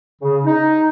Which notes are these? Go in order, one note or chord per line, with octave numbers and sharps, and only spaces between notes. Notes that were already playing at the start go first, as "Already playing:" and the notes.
C#3
D#4